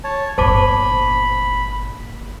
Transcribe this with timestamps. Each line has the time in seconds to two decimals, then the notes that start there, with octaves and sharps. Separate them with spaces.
0.04 C#5 A5
0.38 G1 A#2 C5 A5 B5 D6